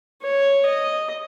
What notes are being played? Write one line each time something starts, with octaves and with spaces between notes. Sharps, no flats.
C#5
D#5